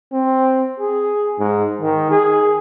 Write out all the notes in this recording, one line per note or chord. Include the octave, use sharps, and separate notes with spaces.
C4
G#4
G#2
D#3
G#4